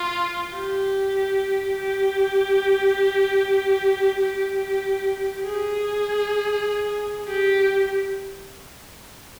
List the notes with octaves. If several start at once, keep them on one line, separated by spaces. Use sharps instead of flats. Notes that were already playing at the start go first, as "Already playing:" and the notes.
Already playing: F4
G4
G4
G4
G#4
G4